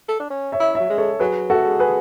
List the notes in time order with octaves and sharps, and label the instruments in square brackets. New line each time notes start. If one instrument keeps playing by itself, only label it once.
[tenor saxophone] A4
D4
C#4
[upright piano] C#5 E5
[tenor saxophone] E4
[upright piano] C#5 E5
[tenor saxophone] F#3
G#3
[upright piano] A4 C#5
[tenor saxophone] F#3 [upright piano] G#4 B4
[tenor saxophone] A3 [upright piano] F#4 A4
[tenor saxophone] G#3
[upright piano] G#4 B4